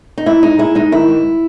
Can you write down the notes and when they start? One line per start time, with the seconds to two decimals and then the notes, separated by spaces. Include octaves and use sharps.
0.18 D#4
0.26 G#2 E4
0.42 G#3 D#4
0.58 G#3 E4
0.75 G#2 D#4
0.92 D#3 E4
1.08 G#2